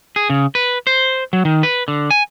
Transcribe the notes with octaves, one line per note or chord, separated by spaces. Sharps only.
G#4
C#3
B4
C5
F#3
D#3
B4
D3
G#5